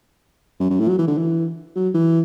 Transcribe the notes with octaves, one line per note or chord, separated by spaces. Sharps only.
F#2
F#2
A2
F#3
E3
D3
E3
F#3
E3